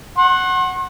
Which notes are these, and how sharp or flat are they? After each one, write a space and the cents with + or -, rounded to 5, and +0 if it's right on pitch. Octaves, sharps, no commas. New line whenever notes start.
F#5 +0 C6 +45